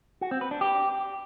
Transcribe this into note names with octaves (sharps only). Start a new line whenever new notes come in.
F#4
C4
B4
D4
G4